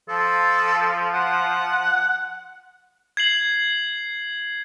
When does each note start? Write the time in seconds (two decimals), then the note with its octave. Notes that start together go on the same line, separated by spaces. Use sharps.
0.09 F3 A4
1.14 F#5
3.17 G#6 C7 F#7